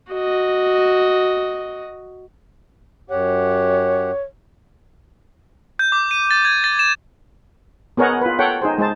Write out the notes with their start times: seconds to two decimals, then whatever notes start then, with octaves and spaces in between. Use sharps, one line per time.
0.12 F#4 D#5
3.10 F#2 G4 C#5 F#5
5.79 G6
5.92 D6
6.11 D#7
6.31 A6
6.45 G#6
6.64 A6
6.79 E7
7.97 B3 G#4 A#4 C#5 D#5 F#5
8.21 F4 B4
8.39 A4 C#5 F#5 G5
8.62 D#4 G#4 C5
8.78 G#3 D#4 C5 A5